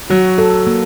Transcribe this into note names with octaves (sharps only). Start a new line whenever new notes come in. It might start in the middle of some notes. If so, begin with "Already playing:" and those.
F#3 F#4
A4
A#3